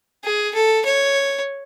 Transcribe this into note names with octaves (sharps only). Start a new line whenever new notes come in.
G#4
A4
C#5